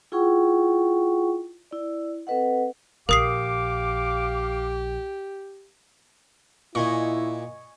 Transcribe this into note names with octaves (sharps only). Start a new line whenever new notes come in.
E4 F4 G#4 F#5 G5 C#6
E4 D5
C4 A4 B4 D#5 F#5
A#1 G4 A#4 F5 D6 D#6 C7
A#2 E4 D#5 G#5 C#6